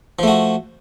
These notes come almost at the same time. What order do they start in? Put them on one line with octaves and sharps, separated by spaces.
F3 A3 F#4